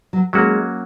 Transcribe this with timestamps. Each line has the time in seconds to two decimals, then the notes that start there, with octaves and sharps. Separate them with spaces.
0.13 F#3
0.33 F#3 G#3 A#3 C#4 F#4